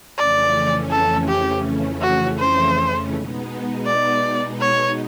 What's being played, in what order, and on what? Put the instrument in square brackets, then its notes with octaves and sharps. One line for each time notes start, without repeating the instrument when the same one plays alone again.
[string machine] F2 C#3 E3 A3 C#4 [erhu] D5
[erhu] A4
G4
F#4
C5
[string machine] B2 G#3 B3 D#4
[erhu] D5
C#5